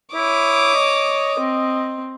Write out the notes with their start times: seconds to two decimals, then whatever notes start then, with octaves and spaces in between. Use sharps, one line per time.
0.14 E4 C#5 D6 D#6
0.75 D#5
1.38 C4